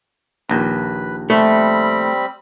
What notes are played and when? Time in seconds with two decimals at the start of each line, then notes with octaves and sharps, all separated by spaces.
0.49 A#1 D#2 B4
1.30 G3 A3 C4 B5